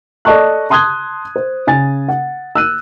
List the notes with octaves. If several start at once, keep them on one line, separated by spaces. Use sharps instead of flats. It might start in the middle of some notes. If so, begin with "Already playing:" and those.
A4 D5 D#5 A5 C#6 F#6
A5 C6 D#6 F#6 G#6 G7
C5
C#3 G#5 A6
F#5
E6 F#6 D#7